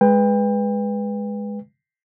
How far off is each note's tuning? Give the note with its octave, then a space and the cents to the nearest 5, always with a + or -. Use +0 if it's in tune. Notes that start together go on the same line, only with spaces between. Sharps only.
G#3 +0 B4 +0 G5 +30